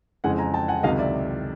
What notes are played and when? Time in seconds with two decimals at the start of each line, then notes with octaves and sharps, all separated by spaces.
0.24 F2 C#3 E3 G#3 F#5 G#5
0.38 G#5 A#5
0.54 G5 A5
0.68 F#5 G#5
0.83 C#2 C3 D#3 F#3 D#5 F5
0.99 D5 E5